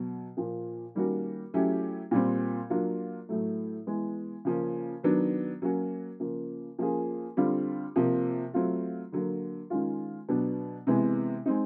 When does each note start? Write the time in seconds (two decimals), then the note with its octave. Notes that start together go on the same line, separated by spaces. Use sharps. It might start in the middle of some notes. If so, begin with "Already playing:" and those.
Already playing: B2 F#3
0.37 A#2 F3 A#3
0.95 D#3 G3 A#3 C#4 F#4
1.54 F#3 A3 C#4 E4 G4
2.11 A#2 G3 C4
2.70 F#3 A#3 D4 F4
3.29 A2 F#3 A3
3.87 E3 G#3 B3
4.45 C#3 F3 A#3 C#4
5.03 D#3 F#3 B3 D4
5.62 F#3 A#3 C#4 F#4
6.20 C#3 F3 A#3
6.79 F3 A#3 C#4 F4 G#4
7.37 D3 G3 C4 F4
7.96 C3 F3 A#3
8.54 F#3 A3 C4 F4
9.12 D3 F#3 A#3
9.70 D#3 G#3 C#4 F4
10.29 B2 F#3 B3 D4
10.87 C3 E3 G#3 B3
11.46 G#3 C4 D#4